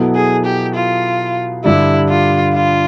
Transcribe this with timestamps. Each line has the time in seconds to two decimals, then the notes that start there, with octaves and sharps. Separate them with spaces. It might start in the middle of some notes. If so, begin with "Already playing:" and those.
Already playing: B2 F#3 B3 E4 A4
0.15 G#4
0.45 G4
0.75 F4
1.64 G2 D3 G3 E4
2.10 F4
2.55 F4